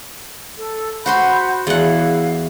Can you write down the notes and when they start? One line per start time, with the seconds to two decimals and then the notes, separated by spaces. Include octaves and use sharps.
0.58 A4
1.06 F#4 C5 F#5 B5 C6 G6
1.67 E2 E4 F5 F#5